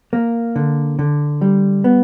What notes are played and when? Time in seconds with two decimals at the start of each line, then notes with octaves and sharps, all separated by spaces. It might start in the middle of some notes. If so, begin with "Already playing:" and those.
0.13 A#3
0.56 D3
0.99 D3
1.41 G3
1.84 B3